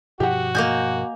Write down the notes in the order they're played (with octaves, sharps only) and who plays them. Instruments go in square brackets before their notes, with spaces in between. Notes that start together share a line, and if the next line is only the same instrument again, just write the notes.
[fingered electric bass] G2 B2 F3 [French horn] F#4 [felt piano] G4 F#5
[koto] A#3 D#5 G#5 [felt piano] G6